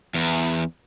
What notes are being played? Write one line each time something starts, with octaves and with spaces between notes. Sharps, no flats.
E2